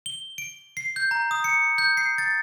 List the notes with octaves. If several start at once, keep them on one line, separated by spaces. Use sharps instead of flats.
G7
D7
C7
G6
A#5
D#6
C#7
G6
C7
A6